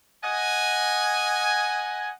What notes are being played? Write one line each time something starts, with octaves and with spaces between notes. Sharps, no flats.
D#5 F#5 G#5